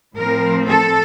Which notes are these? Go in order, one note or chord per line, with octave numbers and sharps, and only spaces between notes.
A2 F3 C4 A#4
A4